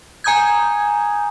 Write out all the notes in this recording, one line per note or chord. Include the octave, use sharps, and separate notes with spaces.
G#5 A#5 D#6 G6 G#6